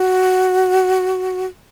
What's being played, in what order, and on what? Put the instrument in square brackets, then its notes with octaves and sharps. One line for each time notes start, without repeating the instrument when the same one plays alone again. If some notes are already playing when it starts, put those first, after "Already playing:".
Already playing: [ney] F#4